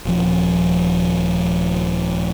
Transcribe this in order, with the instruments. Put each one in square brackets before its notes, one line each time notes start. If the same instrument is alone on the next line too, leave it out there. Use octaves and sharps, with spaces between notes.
[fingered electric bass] D#1 F3